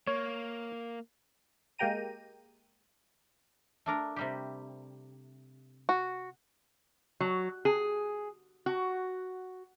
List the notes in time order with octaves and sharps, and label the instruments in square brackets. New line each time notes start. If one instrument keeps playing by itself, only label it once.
[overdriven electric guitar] A#3 [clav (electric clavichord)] C#5
[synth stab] G#3 A#3 G4 G5 A#5 D#7
[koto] A3 D4 A#4
C3 G3 G4
[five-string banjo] F#4
[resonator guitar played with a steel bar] F#3
G#4
F#4